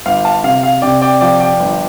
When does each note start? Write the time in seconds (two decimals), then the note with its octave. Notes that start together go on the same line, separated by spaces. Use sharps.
0.06 G1 F5
0.25 F5 A5
0.44 C3 F5
0.63 F5
0.82 C3 D5 G5
1.01 D5 G5
1.21 F3 D5 G5
1.40 D5 G5
1.60 G1